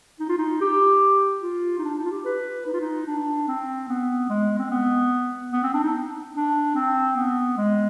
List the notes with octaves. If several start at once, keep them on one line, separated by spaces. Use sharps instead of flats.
D#4
F4
D#4
G4
F4
D#4
D4
D#4
F4
G4
B4
D#4
F4
D#4
D4
C4
B3
G#3
C4
B3
B3
C4
D4
D#4
D4
C4
B3
G#3